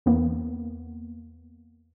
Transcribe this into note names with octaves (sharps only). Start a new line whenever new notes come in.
E2 A#3 B3